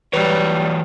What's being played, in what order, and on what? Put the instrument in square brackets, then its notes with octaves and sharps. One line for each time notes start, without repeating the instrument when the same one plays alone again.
[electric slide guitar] E3 F#3 C#5 [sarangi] G3 [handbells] B4